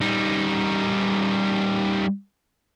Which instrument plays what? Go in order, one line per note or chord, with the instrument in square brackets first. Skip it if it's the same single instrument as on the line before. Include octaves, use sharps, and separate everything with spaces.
[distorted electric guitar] G3 D#4